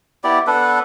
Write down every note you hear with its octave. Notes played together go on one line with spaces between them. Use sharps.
B3 E4 G4 D5
B3 D4 A4 B4